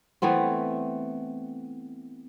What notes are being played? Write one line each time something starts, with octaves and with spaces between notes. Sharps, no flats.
E3 A3 B3 C4